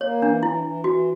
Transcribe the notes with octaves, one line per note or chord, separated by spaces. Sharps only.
A#3 C#5
E3 D4
E3 E4
E3
E3 F#4